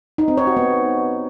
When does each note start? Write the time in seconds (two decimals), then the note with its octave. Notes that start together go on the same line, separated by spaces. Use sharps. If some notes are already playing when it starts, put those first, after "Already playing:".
0.18 D#4
0.28 C4
0.38 C#5
0.47 F#4
0.57 B3